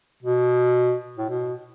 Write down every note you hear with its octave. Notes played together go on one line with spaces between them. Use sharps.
B2
A2
B2